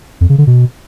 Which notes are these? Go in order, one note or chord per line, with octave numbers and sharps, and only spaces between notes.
F2
C#3
D3
B2